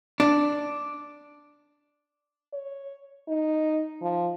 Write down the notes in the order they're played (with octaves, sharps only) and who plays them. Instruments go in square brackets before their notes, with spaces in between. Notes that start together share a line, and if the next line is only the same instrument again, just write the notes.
[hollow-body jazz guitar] D4
[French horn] C#5
D#4
F3